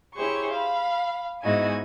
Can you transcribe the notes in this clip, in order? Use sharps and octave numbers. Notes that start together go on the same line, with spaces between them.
E4 G4 G#4 C5 C#5 C#6
F5 B5
G#2 B3 D#4 E4 F#4 G#5